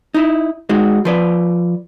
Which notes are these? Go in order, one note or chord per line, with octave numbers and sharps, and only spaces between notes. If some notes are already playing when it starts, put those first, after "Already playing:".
D#4 E4
G#3 D#4 F#4
F3 B4 D5